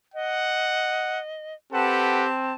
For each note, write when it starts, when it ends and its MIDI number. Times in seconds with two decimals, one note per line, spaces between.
0.14 1.54 75
0.14 1.20 78
1.73 2.54 60
1.73 2.30 67
1.73 2.24 69
1.73 2.24 71
1.73 2.24 78
1.73 2.56 81